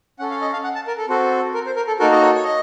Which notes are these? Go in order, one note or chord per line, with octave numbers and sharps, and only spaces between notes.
C#4 A4 F#5
F5
D#5
F5
F#5
A5
A#4
A4
C4 F#4 A4
A#4
C5
A#4
A4
A#3 D#4 F#4 A4 A#4
D#5
C#5
C#5
D#5